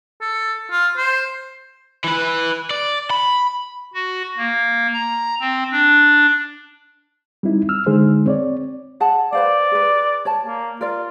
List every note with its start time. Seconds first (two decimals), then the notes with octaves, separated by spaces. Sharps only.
0.21 A4
0.71 F4
0.97 C5
2.04 E3 B4
2.71 D5
3.10 B5
3.94 F#4
4.38 A#3
4.94 A#5
5.41 C4
5.72 D4
7.43 G3 C4 D#4 E4
7.69 E6 F6
7.86 D3 G#3 D#4 G#4 C5
8.26 C4 C#5 D5
9.00 G#4 F#5 A5
9.33 B4 C5 D5 F5
9.72 G#4 B4
10.25 C#5 D5 A5
10.46 A#3
10.81 F4 A#4 D5